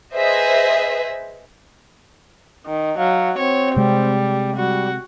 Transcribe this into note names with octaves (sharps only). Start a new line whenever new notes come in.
G#4 B4 C5 D#5 E5
D#3
F#3 F5
C4 C#5
C3 G3 G#3
G3 F#4